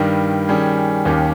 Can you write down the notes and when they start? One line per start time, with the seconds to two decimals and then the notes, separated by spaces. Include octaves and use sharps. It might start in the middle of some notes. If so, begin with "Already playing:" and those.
Already playing: G2 D#3 G3
0.48 D#3 G3 C#4 G#4
1.05 D#2 D#3 A#3 C#4 G4